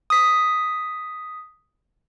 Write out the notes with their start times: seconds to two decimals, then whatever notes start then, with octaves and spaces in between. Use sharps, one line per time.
0.10 D#6 B6